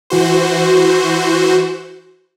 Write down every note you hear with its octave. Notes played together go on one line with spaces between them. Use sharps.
E3 F#4 C5